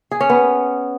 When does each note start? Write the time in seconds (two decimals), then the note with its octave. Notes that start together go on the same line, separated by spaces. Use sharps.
0.11 G#4
0.21 C#4
0.30 B3